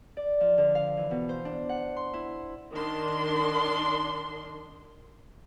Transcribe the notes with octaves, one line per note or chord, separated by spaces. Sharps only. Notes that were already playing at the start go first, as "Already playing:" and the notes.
D5
F3
D3
F5
E3
B2
C5
D4
F#5
C6
E4
D#3 D4 C6